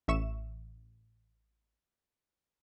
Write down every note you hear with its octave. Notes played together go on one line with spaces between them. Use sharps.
A1 E5 C#6 E7